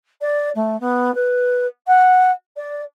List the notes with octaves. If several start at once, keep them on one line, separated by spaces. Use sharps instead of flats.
D5
A3
B3
B4
F#5
D5